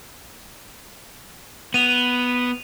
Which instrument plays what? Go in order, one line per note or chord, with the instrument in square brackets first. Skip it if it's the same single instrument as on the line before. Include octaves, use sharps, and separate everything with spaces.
[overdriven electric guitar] B3 [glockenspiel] D#7 F7